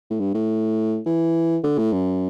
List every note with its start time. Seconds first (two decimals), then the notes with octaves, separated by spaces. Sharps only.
0.10 A2
0.20 G2
0.34 A2
1.06 E3
1.63 D3
1.78 A2
1.93 F#2